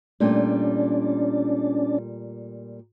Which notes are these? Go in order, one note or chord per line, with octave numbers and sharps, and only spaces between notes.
A#2 G3 A3 C#4 D4 D5